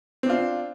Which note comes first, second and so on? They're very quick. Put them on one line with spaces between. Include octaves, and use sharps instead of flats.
C4 D4 F4